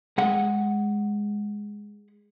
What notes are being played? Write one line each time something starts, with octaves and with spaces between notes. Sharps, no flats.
G#3 G#4 F#5